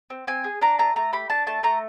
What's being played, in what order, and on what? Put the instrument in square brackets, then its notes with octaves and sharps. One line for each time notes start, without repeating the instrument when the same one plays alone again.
[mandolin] C4
C4 G#5
G#4
D4 A#5
A3 A#5
A3 A#5
G4 B5
D4 A5
A3 A5
A3 A#5